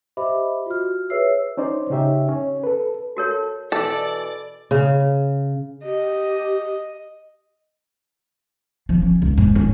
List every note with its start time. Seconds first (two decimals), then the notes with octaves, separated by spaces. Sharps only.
0.17 G4 C5 D#5 E5 B5 D6
0.66 F4 F#4 F6
1.10 G#4 B4 C#5 E5 E6 C7
1.57 C#4 D#4 C5 D5
1.90 C#3 C#4 D#4 G4 E5
2.29 C#4
2.64 A4 B4
3.17 F#4 A4 A#4 C#5
3.72 B2 E3 A4 D5
4.71 C#3
5.84 G4 D#5
8.89 F3
9.02 C#4
9.22 C#2
9.38 G#2
9.55 C#4